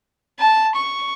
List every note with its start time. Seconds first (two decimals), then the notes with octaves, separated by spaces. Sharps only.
0.39 A5
0.76 C#6